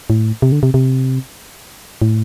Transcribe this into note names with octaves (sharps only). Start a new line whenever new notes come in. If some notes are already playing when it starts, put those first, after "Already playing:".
A2
C3
D3
C3
C3
A2